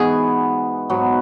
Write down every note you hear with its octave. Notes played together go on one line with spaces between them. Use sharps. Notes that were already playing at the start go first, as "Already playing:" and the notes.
Already playing: G#2 E3 B3 F#4 G#4
G#2 F#3 B3 F#4